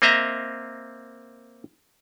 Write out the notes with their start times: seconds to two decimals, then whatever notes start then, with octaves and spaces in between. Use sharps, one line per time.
0.02 A#3 C4 D#5 E5 A#5